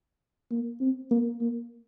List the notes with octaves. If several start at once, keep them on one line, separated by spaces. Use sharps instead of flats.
A#3
C4
A#3
A#3